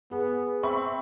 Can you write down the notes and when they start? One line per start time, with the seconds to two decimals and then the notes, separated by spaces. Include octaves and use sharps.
0.11 B3 G#4
0.63 C4 E5 B5 C#6